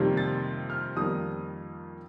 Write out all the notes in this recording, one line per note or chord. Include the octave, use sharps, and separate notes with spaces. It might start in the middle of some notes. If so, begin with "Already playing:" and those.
Already playing: F2 C3 D#3 G3 A#3
A6
F6
F2 D#3 G3 A#3 D#6